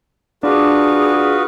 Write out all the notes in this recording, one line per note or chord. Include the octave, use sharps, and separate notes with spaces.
D4 F4 F#4 G#4 B4